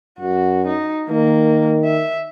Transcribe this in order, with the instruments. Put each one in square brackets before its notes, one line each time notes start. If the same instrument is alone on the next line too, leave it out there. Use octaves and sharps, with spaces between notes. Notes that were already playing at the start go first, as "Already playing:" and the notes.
[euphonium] F#2 [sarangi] F#4
[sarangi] D#4
[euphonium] D#3 [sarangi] A#3
[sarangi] E5